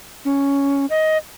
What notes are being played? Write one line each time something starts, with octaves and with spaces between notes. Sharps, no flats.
C#4
D#5